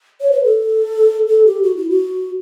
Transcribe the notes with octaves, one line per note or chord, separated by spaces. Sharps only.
C#5
B4
A4
A4
G4
F#4
E4
F#4